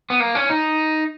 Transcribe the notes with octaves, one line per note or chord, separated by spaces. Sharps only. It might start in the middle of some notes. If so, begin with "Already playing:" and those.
B3
A#3
C#4
D#4